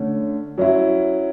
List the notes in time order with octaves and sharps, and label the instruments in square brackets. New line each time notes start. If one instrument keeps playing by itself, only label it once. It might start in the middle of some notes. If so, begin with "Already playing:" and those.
Already playing: [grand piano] D3 A3 C#4
F#3 C#4 E4